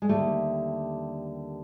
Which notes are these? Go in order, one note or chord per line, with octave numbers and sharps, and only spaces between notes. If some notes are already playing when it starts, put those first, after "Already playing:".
G#3
D#2 D3 G3 A3